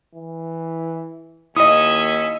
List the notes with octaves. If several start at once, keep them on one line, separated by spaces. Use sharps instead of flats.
E3
D#2 C#4 E4 D#5 E5 D#6